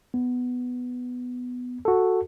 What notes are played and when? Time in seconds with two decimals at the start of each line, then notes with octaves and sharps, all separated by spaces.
0.14 B3
1.85 F#4 A4